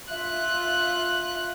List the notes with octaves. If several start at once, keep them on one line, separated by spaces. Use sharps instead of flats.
F4 E5 F#6